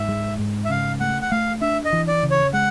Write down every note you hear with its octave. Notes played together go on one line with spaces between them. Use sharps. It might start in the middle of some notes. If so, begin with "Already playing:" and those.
Already playing: G#2 E5
G#3
G#2
E5
C#3 F5
A3 F#5
F#5
A3 F5
D4 E5
D#5
E3
D5
C#3
C#5
G#3 F#5